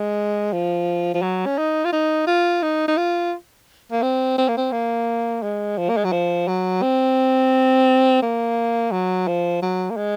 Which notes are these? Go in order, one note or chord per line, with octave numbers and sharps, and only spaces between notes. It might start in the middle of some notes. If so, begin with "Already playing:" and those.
Already playing: G#3
F3
F3
F#3
C#4
D#4
F4
D#4
F4
D#4
D#4
F4
A#3
C4
C4
A#3
C4
A#3
G#3
F3
A#3
G#3
F#3
F3
F#3
C4
A#3
F#3
F3
F#3
A#3
G#3